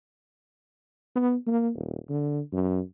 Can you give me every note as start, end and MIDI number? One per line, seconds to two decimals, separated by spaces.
1.16 1.35 59
1.47 1.70 58
1.75 1.97 27
2.10 2.40 50
2.53 2.80 42